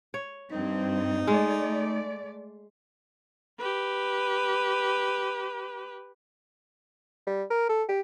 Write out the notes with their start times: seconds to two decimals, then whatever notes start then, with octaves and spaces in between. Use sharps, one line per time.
0.14 C#5
0.52 G2 C4 D#4
1.27 G#3 A3 D5
3.58 G4 B4
7.27 G3
7.50 A#4
7.69 A4
7.89 G4